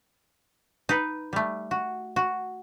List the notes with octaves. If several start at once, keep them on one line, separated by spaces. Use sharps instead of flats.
D#4 B4
G3 A3
F#4
F#4